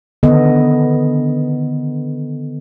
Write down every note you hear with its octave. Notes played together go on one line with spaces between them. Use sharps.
D3 D#3 B3 A4 D#5